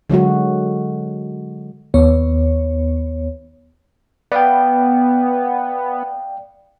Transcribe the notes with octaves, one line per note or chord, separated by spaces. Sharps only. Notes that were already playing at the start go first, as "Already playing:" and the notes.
D3 F#3 G#3 F#4
D#2 B3 C#5
B3 D5 F5 G5